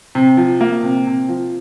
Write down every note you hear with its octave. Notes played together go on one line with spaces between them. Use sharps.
C3
F3
A#3
C3
C3
F3